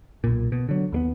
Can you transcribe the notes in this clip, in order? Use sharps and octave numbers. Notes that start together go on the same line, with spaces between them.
B1 A#2
B2
D3 F#3
D#2 G3 B3